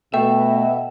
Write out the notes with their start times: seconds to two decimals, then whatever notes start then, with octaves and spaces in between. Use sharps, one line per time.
0.14 B2 A3 E5 G5